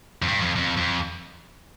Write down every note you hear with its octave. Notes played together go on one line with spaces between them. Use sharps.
F2
G2
F2
F2
F2